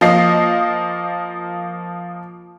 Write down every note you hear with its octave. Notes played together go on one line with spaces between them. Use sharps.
F3 A#3 D#5 C7